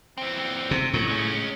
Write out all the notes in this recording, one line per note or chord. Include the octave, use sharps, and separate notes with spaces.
E3 C4
C3
A2 F#3
G#3 C#4